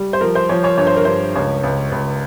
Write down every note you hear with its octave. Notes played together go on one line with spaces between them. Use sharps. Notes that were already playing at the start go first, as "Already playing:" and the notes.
Already playing: G3
C5
F3 A#4
C5
F3 C#5
C#5
G2 C#5
C5
A#4
G2 C5
C#2 C#5
C#2
C#2